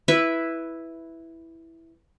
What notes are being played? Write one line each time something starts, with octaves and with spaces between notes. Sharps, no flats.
E4 B4 E5